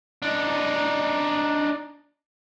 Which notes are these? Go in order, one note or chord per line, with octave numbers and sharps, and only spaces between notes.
D4 D#4